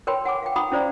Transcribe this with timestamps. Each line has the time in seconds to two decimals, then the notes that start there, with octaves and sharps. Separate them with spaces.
0.07 A#4 B4 C#5 G5 B5 C6
0.25 F#5 G#5 D6
0.42 F5 G5
0.56 F#5 G5 A#5 B5 D#6
0.72 C#4 E4 C5 D5 F5 A#5